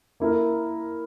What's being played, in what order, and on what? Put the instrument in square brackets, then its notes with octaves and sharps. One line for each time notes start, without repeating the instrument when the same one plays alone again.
[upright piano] A#3 E4 A#4